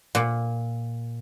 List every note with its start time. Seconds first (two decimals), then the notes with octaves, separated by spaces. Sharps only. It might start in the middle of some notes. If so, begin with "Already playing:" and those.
0.15 A#2